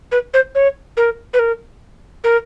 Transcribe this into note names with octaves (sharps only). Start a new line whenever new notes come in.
B4
C5
C#5
A#4
B4
A#4
A#4